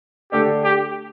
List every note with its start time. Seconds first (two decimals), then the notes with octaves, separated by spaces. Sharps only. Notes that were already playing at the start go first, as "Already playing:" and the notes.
0.32 D3 A3 D4 G4 A4
0.64 G4